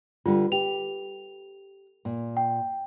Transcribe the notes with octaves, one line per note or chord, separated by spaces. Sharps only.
D3 G3 F4 B4
G4 F7
A#2
G5